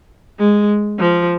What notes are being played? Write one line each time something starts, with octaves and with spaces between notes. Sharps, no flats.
G#3
F3